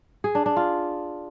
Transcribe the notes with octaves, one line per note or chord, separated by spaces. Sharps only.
G#4
D4
D4
F4